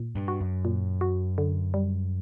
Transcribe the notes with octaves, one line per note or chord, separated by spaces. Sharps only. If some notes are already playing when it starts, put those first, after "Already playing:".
Already playing: A#2
G2
F#4
F#2
A#2
F#4
D3
G3